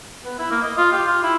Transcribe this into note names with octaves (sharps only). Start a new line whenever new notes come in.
B3
E4
A#3
D#5
F4
G4
F4
E4